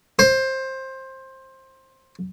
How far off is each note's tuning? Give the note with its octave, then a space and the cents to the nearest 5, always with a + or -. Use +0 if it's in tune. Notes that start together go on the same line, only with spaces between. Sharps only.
C5 +15